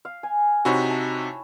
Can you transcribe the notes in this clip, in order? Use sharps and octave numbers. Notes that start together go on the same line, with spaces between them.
F5
G#5
C3 D#4 E4 F#4 C#5
A5